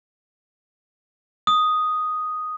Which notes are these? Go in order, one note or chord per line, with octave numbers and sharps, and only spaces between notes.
D#6